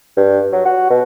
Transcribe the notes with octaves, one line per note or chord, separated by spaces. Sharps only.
G2
F#3
F#4
B2